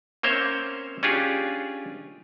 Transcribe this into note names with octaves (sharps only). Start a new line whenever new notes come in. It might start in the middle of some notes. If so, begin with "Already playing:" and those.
A#3 C4 C#4 C5 C#5 E5
C#4 D4 F4 G4 G#4